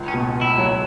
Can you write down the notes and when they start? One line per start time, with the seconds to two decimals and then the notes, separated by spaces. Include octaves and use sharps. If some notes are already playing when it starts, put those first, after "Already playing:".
Already playing: C#2
0.08 C#4
0.14 B2
0.35 C#2
0.41 E4
0.58 F#3